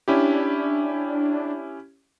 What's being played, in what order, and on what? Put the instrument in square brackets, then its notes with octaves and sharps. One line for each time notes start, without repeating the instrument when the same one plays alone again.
[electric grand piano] C#4 E4 G4 [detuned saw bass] D4